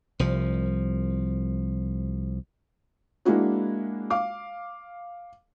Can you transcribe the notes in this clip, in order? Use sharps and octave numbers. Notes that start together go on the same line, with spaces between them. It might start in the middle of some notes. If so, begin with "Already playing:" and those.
C2 F3
G#3 A#3 D4 E4 F#4
F5 D6